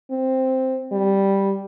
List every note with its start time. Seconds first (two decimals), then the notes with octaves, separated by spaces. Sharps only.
0.11 C4
0.92 G3